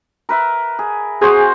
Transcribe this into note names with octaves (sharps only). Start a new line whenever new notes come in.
A#4 B4 E5
G#4
C4 F#4 G#4 C5